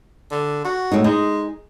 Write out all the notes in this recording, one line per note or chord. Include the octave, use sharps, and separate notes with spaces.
D3
F#4
A2 G#3 D#4
G#3 D#4 G#4